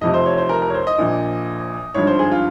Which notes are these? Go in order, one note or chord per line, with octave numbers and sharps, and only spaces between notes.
F1 F2 C3 F3 D#5
C5
C#5
C5
A#4
A#4
C#5
C5
D#5
A#1 A#2 F3
G#1 G2 F3 C#5
C5
G#4
F4